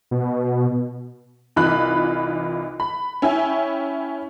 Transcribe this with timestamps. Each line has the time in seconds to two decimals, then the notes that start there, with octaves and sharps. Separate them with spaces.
0.11 B2
1.56 C2 E3 D#4 F4 B5 F#6
2.80 B5
3.22 C#4 E4 E5 G5 G#5